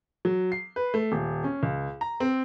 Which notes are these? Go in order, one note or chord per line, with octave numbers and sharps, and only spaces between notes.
F#3
C7
B4
A3
D#1
C#4
C#2
A#5
C4